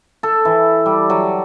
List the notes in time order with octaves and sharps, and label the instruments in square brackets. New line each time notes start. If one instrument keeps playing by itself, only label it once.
[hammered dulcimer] A4
E3
G3
F#3